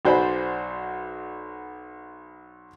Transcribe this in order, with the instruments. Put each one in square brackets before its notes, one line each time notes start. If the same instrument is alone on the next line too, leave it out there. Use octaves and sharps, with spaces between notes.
[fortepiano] B1 F#4 C5 D5 G#5 B5